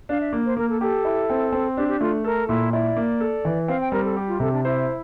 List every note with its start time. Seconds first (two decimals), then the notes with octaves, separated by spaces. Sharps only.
0.09 D4 F5
0.21 E5
0.33 A#3
0.46 C5
0.57 A#3 A#4
0.69 A4
0.81 G4 A4
1.05 E4
1.30 C4
1.52 C4
1.77 D4 G4
1.88 G4
2.01 A3 F4
2.24 A4 A#4
2.48 A#2 E4
2.73 E4 D5
2.97 A#3
3.20 A4
3.45 E3
3.68 C4 F5
3.80 G5
3.92 G3 A#4
4.05 A4
4.17 G4
4.28 F4
4.40 C3 A4
4.53 D4
4.64 E4 C5